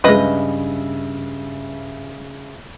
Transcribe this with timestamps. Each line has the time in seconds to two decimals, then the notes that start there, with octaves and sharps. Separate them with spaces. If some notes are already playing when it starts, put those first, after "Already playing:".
0.04 G2 C#3 F3 G#3 B4 D#5 E5